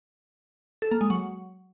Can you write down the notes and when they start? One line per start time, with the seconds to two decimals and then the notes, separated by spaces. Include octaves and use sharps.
0.82 A4
0.91 A#3
1.01 G#3
1.10 F#3